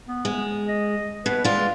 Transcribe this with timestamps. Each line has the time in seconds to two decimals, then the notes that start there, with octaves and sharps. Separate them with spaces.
0.08 B3
0.25 G#3
0.68 D#5
1.26 B2 B4
1.44 G#3 F4 D5